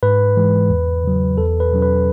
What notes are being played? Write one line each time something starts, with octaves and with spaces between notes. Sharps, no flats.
G#2 B4
E3 G#3
E2
C#3 F#3
E2 A4
B4
B2 F#3 C#4
B4